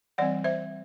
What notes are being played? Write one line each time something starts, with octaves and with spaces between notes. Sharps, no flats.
E3 G3 C4 D5 F#5
C5 E5